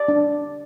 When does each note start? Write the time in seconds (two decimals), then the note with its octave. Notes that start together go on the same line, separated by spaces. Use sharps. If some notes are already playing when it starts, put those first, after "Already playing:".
Already playing: D5
0.08 D4